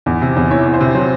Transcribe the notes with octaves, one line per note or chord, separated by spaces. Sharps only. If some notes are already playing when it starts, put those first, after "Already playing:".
E2
C3
E2
E3 C#5
E2
C5
C3
F#3 C5